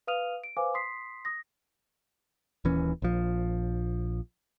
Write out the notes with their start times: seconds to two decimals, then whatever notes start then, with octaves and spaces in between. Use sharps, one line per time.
0.07 B4 F5 D#6 F6 D#7 F7
0.44 D7
0.57 B4 C5 F5 G#5 D6
0.74 C6 D#6 B6 C7
1.25 D#6 A#6
2.65 D#1 A#2 E3 C#4
3.02 A#1 F3